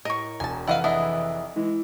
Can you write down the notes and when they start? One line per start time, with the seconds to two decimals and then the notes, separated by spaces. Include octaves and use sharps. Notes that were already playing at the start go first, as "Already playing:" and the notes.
0.05 A2 A#4 D#5 C#6
0.40 E1 G#5 A5
0.68 F1 E3 E4 D#5 F5 F#5 F#7
0.84 D4 E4 G#4 D#5
1.56 E3 G#3